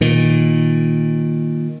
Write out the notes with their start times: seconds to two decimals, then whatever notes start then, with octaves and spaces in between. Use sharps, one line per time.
0.01 A#2 D#3